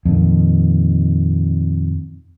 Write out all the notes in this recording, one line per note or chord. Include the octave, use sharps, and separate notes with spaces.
F2 A#2 D#3